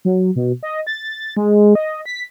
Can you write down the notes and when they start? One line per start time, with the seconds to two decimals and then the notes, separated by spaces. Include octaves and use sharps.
0.05 F#3
0.36 B2
0.63 D#5
0.87 A6
1.37 G#3
1.75 D#5
2.06 B6